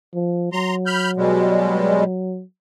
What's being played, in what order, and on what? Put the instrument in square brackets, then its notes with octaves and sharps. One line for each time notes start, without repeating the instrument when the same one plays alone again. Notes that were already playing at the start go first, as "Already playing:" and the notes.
[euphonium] F3
[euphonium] F#3 [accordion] A#5 C6
[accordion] B5 F6 G6
B2 G3 G#3